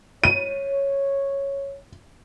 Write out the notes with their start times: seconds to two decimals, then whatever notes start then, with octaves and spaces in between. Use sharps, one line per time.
0.24 C#5 D#7